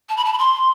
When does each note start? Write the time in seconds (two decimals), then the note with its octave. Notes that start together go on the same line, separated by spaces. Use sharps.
0.09 A5
0.17 B5
0.25 A5
0.33 B5
0.39 C6